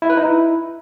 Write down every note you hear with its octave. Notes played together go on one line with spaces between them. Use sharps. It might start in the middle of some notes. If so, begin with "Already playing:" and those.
E4
B4
D#4
E4